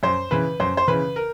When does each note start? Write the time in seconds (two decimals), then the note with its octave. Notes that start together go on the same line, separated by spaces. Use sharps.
0.03 F#2 C5
0.31 C#3 E3 B4
0.60 F#2 C5
0.77 C5
0.88 C#3 E3 B4
1.16 A#4